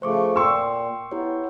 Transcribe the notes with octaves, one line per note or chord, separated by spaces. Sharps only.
C#3 F3 A3 C5 C#6 D6
A#2 G5 C6 C#6 E6
B3 E4 G4 C#5